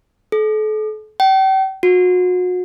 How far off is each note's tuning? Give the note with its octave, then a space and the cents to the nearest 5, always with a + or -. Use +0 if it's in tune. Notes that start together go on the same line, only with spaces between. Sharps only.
A4 -40
G5 -40
F#4 -35